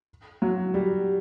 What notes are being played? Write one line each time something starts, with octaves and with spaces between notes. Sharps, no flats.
F#3
G3